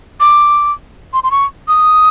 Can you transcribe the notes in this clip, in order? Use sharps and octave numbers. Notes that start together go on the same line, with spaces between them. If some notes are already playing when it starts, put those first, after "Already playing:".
D6
C6
C6
C#6
D#6